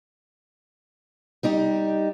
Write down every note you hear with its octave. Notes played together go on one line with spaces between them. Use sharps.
G3 D#4 G4